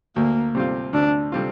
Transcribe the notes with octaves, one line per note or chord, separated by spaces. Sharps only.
D2 A#3
C3 G3 C4 F4
D2 D4
C3 G3 C4 F4